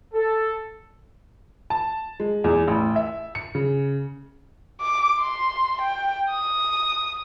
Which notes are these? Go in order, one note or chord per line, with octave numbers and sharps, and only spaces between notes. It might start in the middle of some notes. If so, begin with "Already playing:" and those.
A4
A5
G#3
E2
A1
E5
C#7
C#3
D6
C6
G5
D#6